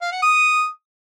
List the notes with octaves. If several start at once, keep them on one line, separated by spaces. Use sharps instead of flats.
F5
F#5
D#6